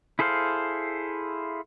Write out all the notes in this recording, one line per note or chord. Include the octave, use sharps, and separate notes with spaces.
E4 G#4 A4 C5 F5